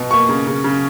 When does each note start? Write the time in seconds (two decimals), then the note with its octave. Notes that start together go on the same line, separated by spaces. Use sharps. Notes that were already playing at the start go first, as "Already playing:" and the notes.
Already playing: B2
0.11 A#3 C#6
0.29 C#3
0.47 C#3
0.64 C#3